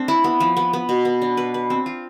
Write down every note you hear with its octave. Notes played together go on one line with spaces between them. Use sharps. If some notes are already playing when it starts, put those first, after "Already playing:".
Already playing: A3 C4 D4
E4
B3
F3
B3
B3
B2
B3
D4
B4
B4
C4
F4